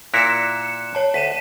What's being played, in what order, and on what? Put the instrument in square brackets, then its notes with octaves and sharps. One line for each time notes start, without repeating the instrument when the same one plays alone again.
[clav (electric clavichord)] A#2 E4 A#4 [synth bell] F#6 C#7 E7
[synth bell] C#5 A5
[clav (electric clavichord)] D2 [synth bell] B6 D#7 E7